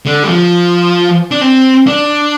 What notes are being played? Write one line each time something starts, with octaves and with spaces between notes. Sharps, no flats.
D3
G3
F3
D4
C4
D4